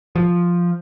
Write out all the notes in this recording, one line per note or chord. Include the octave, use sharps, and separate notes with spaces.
F3